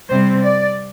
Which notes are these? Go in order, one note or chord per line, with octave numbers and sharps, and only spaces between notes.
C3 G3 C4 C5
D5